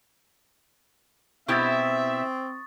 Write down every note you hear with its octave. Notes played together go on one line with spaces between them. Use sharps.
B2 C4 E4 G4 E5 C#6 D#6 A6